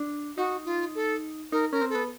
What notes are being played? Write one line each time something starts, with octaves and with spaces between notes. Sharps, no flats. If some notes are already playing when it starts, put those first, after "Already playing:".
Already playing: D4
D#4 F#4
F4
A4
D#4 A#4
C#4 A#4
C4
A4
B3